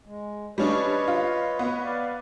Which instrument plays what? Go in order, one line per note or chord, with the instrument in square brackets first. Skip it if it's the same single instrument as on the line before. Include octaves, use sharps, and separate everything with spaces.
[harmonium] G#3
[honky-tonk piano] G3 C#4 D4 [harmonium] B4 C#5 D#5
[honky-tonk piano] F4
B3
[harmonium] D5 F5